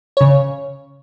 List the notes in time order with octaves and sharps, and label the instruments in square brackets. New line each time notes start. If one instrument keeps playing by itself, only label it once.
[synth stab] C#3 C#5